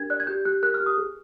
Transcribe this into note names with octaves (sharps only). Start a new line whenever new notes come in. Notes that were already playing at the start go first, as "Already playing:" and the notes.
Already playing: D4 G4 A#4 G#6
D5 F#6
G#6
G4 G6
G4 F#6
A#4 F#6
F6
G4
D#6
G#4